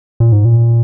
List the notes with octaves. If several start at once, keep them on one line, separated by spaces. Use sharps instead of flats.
A#2
G#2
A#2